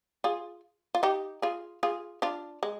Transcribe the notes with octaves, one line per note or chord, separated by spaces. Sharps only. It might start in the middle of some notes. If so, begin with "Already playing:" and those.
F4 G#4
F4
D#4 G4
F4 G#4
F4 G#4
D4 F4
G#3